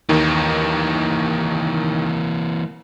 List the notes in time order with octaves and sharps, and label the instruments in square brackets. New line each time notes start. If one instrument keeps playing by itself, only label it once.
[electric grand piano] D#2 D#3 [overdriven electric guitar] E3 A#3